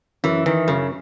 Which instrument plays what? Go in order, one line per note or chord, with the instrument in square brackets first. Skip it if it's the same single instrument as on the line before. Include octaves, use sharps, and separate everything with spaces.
[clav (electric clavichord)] F#2 [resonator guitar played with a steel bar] E3
[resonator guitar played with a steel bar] D#3 [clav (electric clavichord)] E3
[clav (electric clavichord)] F#2 [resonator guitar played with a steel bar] C#3